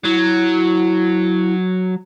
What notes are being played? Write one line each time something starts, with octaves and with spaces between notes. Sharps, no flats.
F#3 E4